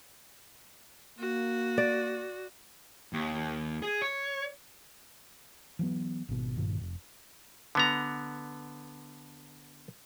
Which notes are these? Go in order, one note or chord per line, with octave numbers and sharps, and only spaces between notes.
A#3 F#4
D5
D#2
G#4
C#5
E3 F#3 B3
G#1 B2
G1 G2 A#2 D#3
F1
D3 B3 A#5